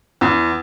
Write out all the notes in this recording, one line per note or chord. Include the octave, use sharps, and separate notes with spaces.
E2